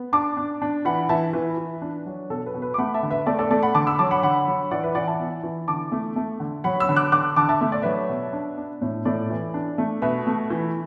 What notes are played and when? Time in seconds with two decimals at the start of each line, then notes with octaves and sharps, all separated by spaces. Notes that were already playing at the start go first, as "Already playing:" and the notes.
Already playing: B3
0.13 D4 A5 D6
0.37 D4
0.62 D4
0.85 E3 F#5 B5
1.09 E3 E5 A5
1.33 E3 B4
1.58 E3
1.82 D4
2.06 F#3
2.30 B2 A4
2.46 B4
2.54 B2
2.62 B4
2.74 D6
2.78 A3 F#5 B5
2.94 E5 A5
3.03 D3
3.10 B4 E5
3.26 A3 A4 D5
3.39 A4 D5
3.50 A3 A4 D5
3.63 F#5 B5
3.75 D3 A5 D6
3.87 B5 E6
3.99 F#3 A5 D6
4.11 F#5 B5
4.23 D3 F#5 B5
4.47 F#3
4.71 E3 D5 F#5
4.83 B4 E5
4.95 E3 D5 F#5
5.07 E5 A5
5.19 B3
5.43 E3
5.68 D3 A5 D6
5.92 A3
6.16 A3
6.40 D3
6.64 F#3 F#5 B5
6.80 B5 E6
6.89 D3
6.96 D6 F#6
7.12 D3 D6 F#6
7.36 D3 A5 D6
7.49 E5 A5
7.61 A3 E5
7.72 D5
7.82 F#3 B4 E5
8.09 B2
8.33 D4
8.57 D4
8.82 A2
9.05 A2 A4 D5
9.30 E3
9.54 D4
9.78 A3
10.02 B2 B4 E5
10.27 A3
10.50 E3